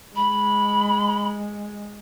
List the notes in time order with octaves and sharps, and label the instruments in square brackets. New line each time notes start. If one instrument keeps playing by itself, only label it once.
[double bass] G#3 [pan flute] B5